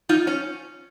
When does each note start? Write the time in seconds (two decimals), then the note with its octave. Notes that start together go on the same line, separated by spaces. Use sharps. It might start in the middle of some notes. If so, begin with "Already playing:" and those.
0.09 D#4 F4
0.27 C#4